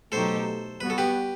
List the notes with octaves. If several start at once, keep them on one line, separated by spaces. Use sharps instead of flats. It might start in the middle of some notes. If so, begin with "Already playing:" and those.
B2 F#3 A3 D#4 G4 A4 C5
G3 B3 F#4 B4
A4
G4 B4